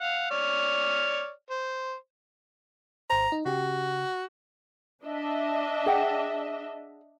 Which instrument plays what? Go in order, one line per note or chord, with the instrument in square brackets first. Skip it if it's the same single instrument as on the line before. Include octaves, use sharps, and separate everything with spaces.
[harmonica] F5 F#5
C#5 D5 F6
C5
[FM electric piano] G#1 C5 [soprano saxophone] A#5
[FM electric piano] D#4
[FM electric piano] C#3 G4 [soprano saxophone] F#4
[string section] D4 D#5 E5
[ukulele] G#4 F#5 G5